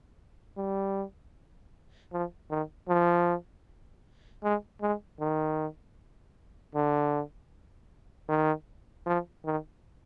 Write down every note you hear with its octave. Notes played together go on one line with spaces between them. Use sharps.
G3
F3
D#3
F3
G#3
G#3
D#3
D3
D#3
F3
D#3